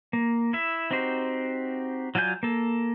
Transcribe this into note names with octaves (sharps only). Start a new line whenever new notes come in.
A#3
E4 E5
C4 D#4 F#4 G4 C5
F#3 F4 D5 G#5 G6
A#3 A4